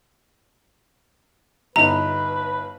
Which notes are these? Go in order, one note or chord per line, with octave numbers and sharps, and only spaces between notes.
G1 D#4 E4 B4 A#5